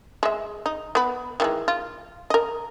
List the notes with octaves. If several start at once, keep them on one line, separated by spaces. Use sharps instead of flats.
G#3 E5
D#4
B3 B4
D#3 E3 G#3
F4
A#4 D#5